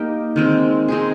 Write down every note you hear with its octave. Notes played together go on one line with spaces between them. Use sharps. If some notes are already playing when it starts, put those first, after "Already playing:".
Already playing: A#3 D#4 G4
D#3 G#3 C4
G#3 C4 D#4 G#4